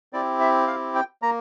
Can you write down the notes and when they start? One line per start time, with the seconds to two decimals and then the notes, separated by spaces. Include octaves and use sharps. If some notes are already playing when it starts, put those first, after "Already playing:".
0.13 C4 E4 G4 D5
0.40 E5
0.67 F5
0.95 G5
1.22 A#3 A#5